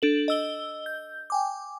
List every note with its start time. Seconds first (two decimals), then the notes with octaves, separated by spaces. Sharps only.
0.02 D4 A4 F#7
0.28 D#5 E6 G7
0.86 G6
1.30 G5 G#5 D6